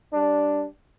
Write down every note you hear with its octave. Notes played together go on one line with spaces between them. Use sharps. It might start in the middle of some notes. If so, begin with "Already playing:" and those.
G3 D4